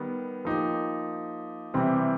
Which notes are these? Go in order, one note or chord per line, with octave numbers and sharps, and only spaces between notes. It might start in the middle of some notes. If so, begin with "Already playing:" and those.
Already playing: D#3 G3 B3
F3 A#3 D#4 G4
C3 E3 G3 C4